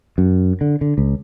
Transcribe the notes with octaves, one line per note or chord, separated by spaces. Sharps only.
F#2
D3
D3
C#2